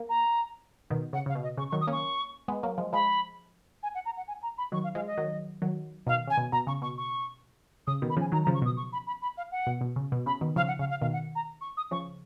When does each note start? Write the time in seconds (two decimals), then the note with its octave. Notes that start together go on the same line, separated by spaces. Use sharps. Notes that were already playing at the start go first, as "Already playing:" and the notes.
Already playing: A#3
0.09 A#5
0.90 B2 D#3
1.13 C#3 F#5
1.26 C#3 F5
1.35 B2
1.43 D#5
1.57 C#3 C#6
1.70 C#6
1.72 D#3 F#3
1.81 D#6
1.87 A#3 C#4 C#6
2.48 G#3 B3
2.63 F#3 A#3
2.78 F3 G#3
2.93 F3 G#3 B5
3.83 G#5
3.94 F#5
4.05 A#5
4.16 F#5
4.27 G#5
4.42 A#5
4.58 B5
4.72 D#3 F#3 C#6
4.83 F5
4.95 F3 G#3 F5
5.06 D#5
5.18 D#3 F#3
5.62 D#3 F#3
6.07 B2 D#3 F5
6.27 C#3 G#5
6.37 B2
6.52 B2 A#5
6.67 C#3 C#6
6.82 B2 C#6
6.97 C#6
7.87 C#3 D#6
8.02 B2 D#3
8.09 B5
8.17 C#3 F3 G#5
8.32 D#3 F#3 A#5
8.44 A#5
8.47 C#3 F3
8.54 C#6
8.62 B2 D#6
8.76 C#6
8.92 B5
9.07 B5
9.21 B5
9.37 F5
9.51 F#5
9.67 B2
9.81 B2
9.96 C#3
10.12 B2
10.26 C#3 B5
10.41 B2 D#3
10.56 C#3 F3 F5
10.67 F#5
10.79 C#3 F5
10.90 F5
11.01 B2 D#3 F5
11.12 F#5
11.35 A#5
11.61 C#6
11.77 D#6
11.91 C#3 F3 C#6